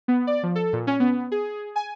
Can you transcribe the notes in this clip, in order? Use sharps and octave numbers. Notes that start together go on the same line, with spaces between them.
B3
D5
F3
A4
A#2
C#4
B3
G#4
G#5